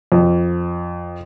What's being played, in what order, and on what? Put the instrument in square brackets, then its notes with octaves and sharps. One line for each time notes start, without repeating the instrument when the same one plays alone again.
[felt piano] F2